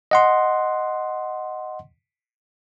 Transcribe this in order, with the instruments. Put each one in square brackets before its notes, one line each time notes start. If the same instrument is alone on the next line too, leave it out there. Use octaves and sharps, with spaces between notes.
[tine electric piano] D#5 F#5 C6